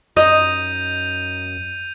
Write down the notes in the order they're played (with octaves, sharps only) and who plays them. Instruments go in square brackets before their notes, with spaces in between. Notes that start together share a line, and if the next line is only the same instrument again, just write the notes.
[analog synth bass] F#2 [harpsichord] D#4 [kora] D#5 [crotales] G6 D#7 F7